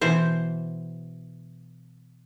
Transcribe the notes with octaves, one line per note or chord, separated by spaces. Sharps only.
B2 E3 C5